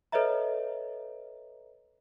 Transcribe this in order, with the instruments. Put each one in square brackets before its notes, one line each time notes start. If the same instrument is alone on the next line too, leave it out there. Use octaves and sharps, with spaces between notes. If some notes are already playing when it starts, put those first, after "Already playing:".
[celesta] A4 B4 C#5 D#5 E5 A#5